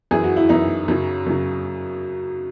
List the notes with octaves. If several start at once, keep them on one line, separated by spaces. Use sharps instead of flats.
F#2 E3 G#4
F#4
E4
F#2 E3 D#4
F#2 C#3 F#3
F#2 C#3 F#3